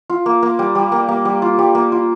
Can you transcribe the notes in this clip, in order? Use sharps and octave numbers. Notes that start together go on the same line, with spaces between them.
F4
A#3
A#3
G3
G3
A#3
A#3
G3
F4
G3
A#3
F4